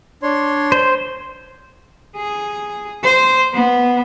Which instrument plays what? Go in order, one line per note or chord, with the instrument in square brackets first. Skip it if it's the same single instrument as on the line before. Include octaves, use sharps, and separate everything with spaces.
[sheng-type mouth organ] D4 C#5 C6
[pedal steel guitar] C5
[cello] G#4
C5
B3